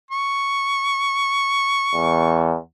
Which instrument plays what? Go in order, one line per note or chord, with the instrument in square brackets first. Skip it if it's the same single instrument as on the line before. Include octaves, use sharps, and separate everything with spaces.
[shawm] C#6
[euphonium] E2